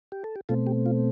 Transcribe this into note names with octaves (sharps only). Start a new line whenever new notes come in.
G4
A4
G4
B2 A3 C4 F4 A4
G4
F4